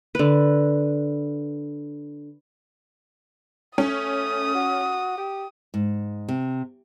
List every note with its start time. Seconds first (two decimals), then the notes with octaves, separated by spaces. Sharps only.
0.15 D3 B4
3.78 A3 C#4 D#6
4.55 F#4
5.18 G4
5.74 G#2
6.28 C3